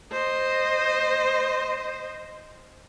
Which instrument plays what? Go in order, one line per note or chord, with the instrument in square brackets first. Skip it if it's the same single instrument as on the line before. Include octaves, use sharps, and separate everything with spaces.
[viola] C5 D#5